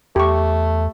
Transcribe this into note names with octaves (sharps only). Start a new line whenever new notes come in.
E2 A3 G4 C#6